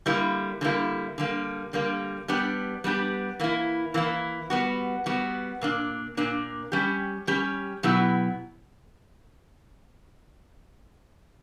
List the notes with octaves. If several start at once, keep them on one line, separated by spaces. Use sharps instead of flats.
D3 G3 A#3 E4
D3 G3 A#3 E4
D3 G3 A#3
D3 G3 A#3
G3 B3 D4 G4
G3 B3 D4 G4
E3 A#3 E4
E3 A#3 E4
G3 B3 F#4
G3 B3 F#4
A#2 A#3 D4
A#2 A#3 D4
G3 C#4 G4
G3 C#4 G4
B2 F#3 B3 E4 G4